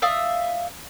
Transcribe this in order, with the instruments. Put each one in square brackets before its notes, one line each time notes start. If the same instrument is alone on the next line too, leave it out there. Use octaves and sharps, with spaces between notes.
[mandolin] D5 E5 F5 D#6